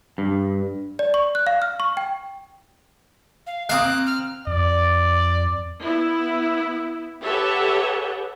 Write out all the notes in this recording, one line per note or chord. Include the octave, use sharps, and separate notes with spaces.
G2
D5
C#6
F#6
F5
F6
C#6
G5
F5
A#3 C4 F5 D6 D#6 F#6
F6
F2 D5
B3 E4
G4 A4 B4 C#5 E5 F#5